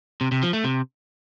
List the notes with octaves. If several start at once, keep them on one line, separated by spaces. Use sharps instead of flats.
C3
C3
F3
A3
C3